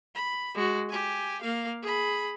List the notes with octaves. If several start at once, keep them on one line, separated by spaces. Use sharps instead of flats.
B5
G#3 F#4
G4 G#5
A#3 F5
G#4 B5